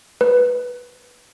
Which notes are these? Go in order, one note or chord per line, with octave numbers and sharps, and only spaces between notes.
B4